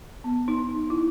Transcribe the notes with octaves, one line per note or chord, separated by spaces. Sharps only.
B3
D#4
E4